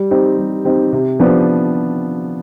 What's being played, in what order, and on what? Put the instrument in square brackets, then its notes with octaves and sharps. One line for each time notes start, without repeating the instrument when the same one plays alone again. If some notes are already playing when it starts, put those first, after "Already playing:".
Already playing: [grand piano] G3
C4 D#4 G4
G3
C4 D#4 G4
C3
F3 B3 D4 G4